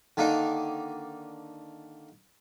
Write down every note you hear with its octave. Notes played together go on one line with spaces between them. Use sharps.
D3 D#3 A#3 D4 D#4